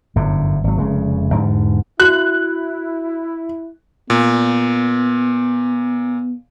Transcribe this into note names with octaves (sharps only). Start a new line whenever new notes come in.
G1 F#2 A2 D3
G#1 F#3
F1 C#3 G#3
E2 G#2 D3 G3
E4 F#4 F#6
A#2 B3